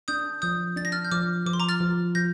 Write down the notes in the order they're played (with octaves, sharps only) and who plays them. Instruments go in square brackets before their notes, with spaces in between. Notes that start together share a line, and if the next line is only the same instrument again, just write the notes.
[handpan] D4 [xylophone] D#6 G6
[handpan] F3 [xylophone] D#6 G6
[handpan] D4 [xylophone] A6
[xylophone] A#6
F6 A6
G6
[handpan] F3 [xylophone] D6 F6
[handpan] F3 [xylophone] D6
[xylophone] C6
A#5 D6
F6 A6
[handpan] F3
[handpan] F3 [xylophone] G6 A#6